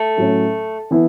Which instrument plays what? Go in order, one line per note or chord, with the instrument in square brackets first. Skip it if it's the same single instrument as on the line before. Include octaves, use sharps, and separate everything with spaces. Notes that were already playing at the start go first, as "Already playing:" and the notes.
Already playing: [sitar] A3
[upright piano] A2 F#3 C#4
E3 B3 E4